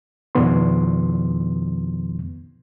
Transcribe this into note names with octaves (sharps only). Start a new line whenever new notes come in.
F2 B2 D#3 F3 B3 C6